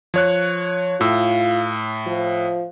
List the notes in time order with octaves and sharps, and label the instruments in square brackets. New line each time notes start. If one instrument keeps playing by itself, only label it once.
[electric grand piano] F3 C#5 F#6
[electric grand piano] A2 E6 [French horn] F4
[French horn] F3